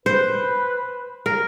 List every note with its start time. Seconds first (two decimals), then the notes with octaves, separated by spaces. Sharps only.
0.06 B4 C5
1.26 A#4